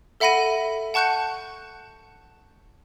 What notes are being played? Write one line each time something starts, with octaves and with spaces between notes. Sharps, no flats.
A4 E5 F#5 B5 A#6 D#7
F#5 A5 C#6 F#6 G6 C#7